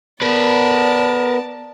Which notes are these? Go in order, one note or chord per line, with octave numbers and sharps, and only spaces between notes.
B3 A#4 B4 D5 A5